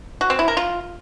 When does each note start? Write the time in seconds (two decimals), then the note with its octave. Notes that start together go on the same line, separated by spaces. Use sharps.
0.21 F#4
0.30 C4
0.39 E4
0.48 A#4
0.57 F4